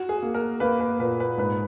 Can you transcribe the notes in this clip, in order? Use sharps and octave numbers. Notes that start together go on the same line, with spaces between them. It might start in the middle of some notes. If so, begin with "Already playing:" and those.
Already playing: F#4
G#4
A#3
A#4
A#3 B4
B4
A#2 B4
B4
G#2 B4